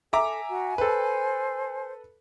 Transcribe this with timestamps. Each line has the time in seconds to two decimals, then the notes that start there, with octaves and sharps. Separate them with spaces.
0.13 A4 E5 G#5 A#5 D6
0.49 F#4
0.78 A4 B4 C5